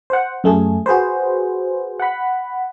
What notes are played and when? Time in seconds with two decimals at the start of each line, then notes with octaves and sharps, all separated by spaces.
0.10 C5 F#5
0.44 F#2 A3 G#4
0.86 F#4 G#4 B4 C5
2.00 F#5 B5